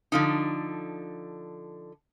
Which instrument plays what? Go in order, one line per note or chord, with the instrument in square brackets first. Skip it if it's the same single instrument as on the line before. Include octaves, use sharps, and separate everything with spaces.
[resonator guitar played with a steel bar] D3 F3 D#4